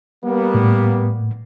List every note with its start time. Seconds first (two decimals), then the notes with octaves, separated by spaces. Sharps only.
0.24 G3 A#3 B3
0.54 A2